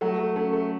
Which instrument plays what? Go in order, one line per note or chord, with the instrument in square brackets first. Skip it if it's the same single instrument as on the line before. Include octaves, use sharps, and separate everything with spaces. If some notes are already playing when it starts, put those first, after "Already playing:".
[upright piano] F#3 [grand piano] A3
[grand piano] A3
[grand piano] A3 [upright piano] C#4
[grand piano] A3